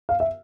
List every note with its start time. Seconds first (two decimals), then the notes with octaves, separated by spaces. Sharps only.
0.09 F5
0.20 E5